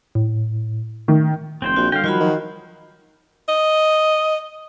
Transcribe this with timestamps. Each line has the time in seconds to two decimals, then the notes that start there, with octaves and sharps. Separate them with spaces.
0.15 A2
1.08 D#3 A3
1.62 F1 C4 C5 G5
1.76 A#1 F#4
1.92 D3 G3 F5 G5
2.04 D#3 F3 F#3 F4 F#4 B5
2.20 D#3
3.48 D#5